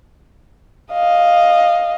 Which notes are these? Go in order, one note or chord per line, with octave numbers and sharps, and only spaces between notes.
D#5 F5